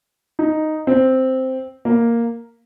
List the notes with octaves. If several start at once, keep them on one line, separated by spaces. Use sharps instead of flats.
D#4
C4
A#3